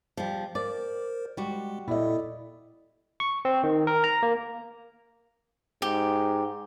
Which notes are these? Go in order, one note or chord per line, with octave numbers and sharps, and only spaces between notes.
F3 G3
A#4 C5 D5
G3 G#3 F#4
A#2 E4 A4 D5 D#5
C#6
C4
D#3
A#4
A#5
A#3
G#2 G4